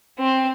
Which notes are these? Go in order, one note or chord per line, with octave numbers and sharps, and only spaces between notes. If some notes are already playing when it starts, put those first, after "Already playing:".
C4